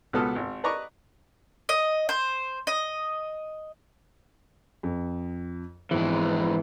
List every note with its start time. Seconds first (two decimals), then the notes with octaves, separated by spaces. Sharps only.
0.13 C#2 B2 B3 A4 D#6 F6
0.36 G#1
0.64 B4 D5 D#5 A#5 C#6 D6
1.69 D#5
2.09 C5
2.67 D#5
4.83 F2
5.91 G#1 F2 E3 G#3 B3